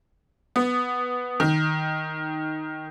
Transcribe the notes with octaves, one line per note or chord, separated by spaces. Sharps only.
B3
D#3